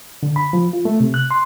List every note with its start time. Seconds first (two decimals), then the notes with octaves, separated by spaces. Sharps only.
0.23 D3
0.36 B5
0.53 F3
0.73 F4
0.85 A3
1.00 C3
1.14 F#6
1.31 C6